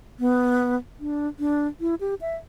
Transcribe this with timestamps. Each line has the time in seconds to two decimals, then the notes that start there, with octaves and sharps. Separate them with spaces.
0.19 B3
1.00 D4
1.39 D4
1.81 E4
2.01 G4
2.21 E5